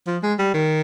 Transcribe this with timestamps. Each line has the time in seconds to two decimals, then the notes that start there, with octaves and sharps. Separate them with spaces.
0.07 F3
0.23 G#3
0.39 G3
0.54 D#3